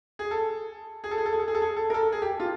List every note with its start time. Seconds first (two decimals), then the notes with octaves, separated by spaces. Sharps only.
0.19 G#4
0.31 A4
1.04 G#4
1.11 A4
1.18 G#4
1.26 A4
1.33 G#4
1.39 A4
1.48 G#4
1.55 A4
1.62 G#4
1.76 A4
1.90 A#4
1.94 A4
2.12 G#4
2.22 G4
2.40 F4